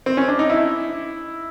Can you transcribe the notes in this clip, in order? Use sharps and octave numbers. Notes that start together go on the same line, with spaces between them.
C4
C#4
D4
D#4
E4